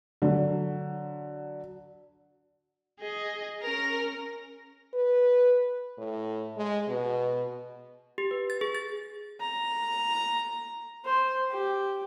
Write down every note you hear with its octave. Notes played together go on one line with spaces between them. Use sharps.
D3 F#3
G#4 D#5
C#4 A#4 A#6
B4
A2
G#3
B2
G4
B4
A6
G#4
A6
A#5
C5
G4